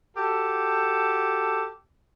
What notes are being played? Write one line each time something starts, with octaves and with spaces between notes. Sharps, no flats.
F#4 G4 A4